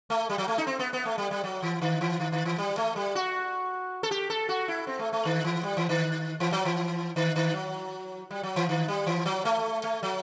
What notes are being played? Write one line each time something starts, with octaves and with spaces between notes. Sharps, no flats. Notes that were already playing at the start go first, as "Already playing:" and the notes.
A3
G3
F#3
A3
D#4
C4
B3
B3
A3
G3
G3
F#3
E3
D#3
E3
D#3
D#3
E3
G3
A3
G3
F#4
A4
G4
A4
F#4
E4
C4
A3
A3
D#3
E3
G3
E3
D#3
E3
F#3
E3
D#3
D#3
F#3
G3
F#3
E3
D#3
G3
E3
F#3
A3
A3
F#3